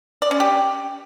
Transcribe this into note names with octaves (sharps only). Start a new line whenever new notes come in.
D5
C#4
G4